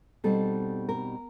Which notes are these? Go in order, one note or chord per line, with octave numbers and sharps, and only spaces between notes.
B2 G3 C4 D#4 A4
A#4